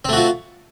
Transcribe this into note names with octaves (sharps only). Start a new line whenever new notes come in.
A3 C4 F4 F#4